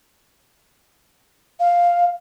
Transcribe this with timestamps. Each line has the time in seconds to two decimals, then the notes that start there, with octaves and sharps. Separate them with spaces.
1.60 F5